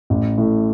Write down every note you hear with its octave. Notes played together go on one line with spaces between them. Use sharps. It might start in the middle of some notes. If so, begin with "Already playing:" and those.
A1
A2